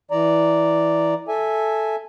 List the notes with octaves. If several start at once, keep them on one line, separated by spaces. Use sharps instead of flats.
E3 D5 A#5
A4 E5 G#5